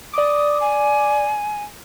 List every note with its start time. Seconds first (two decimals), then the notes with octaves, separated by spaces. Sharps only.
0.14 D5 D6 D#6
0.61 G#5